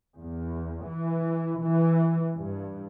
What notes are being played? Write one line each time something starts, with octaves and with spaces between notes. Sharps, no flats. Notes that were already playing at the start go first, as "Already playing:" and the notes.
E2
E3
E3
G2